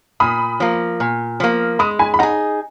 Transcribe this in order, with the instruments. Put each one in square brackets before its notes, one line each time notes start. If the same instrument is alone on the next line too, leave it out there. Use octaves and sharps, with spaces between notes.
[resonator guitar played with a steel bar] A#2 [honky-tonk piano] B5 D#6
[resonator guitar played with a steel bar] F3 A#3
A#2
F3 A#3
[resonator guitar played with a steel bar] G#3 [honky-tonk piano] B5 D#6
[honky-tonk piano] G#5 B5
B5
[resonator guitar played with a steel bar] D#4 [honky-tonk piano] F#5 A#5
[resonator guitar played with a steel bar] G#4